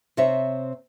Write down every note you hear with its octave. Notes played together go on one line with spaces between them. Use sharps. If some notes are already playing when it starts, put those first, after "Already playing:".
C3 C4 C#5 E5